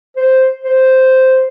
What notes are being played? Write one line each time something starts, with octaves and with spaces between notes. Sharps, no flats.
C5
C5